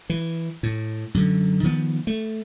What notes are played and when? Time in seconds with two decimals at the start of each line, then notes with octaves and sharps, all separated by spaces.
0.10 E3
0.63 A2
1.14 F#2 D3
1.63 D#3 F3 B3
2.07 A3